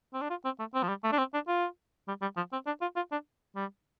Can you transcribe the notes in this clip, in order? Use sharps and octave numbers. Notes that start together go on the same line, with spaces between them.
C4
D4
F4
C4
A3
C4
F3
G3
A3
D4
C4
D4
F4
G3
G3
F3
C4
D4
F4
F4
D4
G3